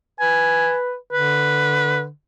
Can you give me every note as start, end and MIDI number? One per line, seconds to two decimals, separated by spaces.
0.20 0.95 71
0.20 0.76 80
1.12 2.09 50
1.12 2.03 71